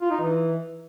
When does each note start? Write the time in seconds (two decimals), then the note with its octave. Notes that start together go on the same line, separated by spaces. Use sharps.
0.01 F4
0.11 D#4
0.20 E3